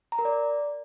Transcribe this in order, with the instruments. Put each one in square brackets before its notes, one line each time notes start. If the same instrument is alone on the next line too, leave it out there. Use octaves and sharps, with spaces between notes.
[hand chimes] A#5
A#4
D5